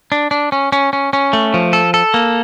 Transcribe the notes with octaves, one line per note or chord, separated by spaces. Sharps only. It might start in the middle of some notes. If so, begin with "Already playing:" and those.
D4
D4
C#4
C#4
C#4
C#4
A3
F3
A4
A4
A#3